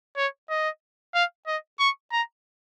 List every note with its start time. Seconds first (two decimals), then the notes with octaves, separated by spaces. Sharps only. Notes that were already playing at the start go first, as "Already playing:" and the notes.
0.17 C#5
0.50 D#5
1.14 F5
1.47 D#5
1.80 C#6
2.12 A#5